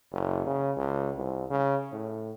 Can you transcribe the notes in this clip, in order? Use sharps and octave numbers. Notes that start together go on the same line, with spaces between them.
F#1
C#3
C#2
C2
C#3
A2